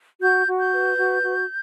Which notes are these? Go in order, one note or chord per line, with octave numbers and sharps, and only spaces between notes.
F#4 G6
F#4
G6
B4
F#4
F#4